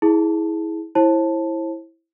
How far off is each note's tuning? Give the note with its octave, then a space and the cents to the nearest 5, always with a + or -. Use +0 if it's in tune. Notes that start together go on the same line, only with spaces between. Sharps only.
E4 -20 G#4 +10 A5 +0
E4 +0 C5 +40 A5 +0